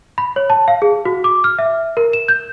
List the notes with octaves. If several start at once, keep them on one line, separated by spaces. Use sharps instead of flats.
B5
C#5
A5
F5
G#4
F#4
D6
F6
E5
A#4
E7
G6